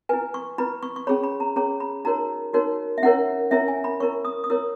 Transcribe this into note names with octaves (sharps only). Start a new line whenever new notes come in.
E4 B4 G#5
C#6
E4 B4 B5
C#6
C#6
C#4 G#4 C#5 B5
B5
A#5
C#4 G#4 C#5 A#5
B5
D#4 F#4 A#4 C#5 A#5
D#4 F#4 A#4 C#5
E5
C#4 E4 A#4 C#5 F#5
C#4 E4 A#4 C#5 E5
G#5
B5
E4 A#4 C#5 C#6
D#6
D#6
E4 A#4 C#5 E6